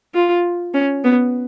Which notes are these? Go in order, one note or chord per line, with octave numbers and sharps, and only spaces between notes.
F4
C#4
B3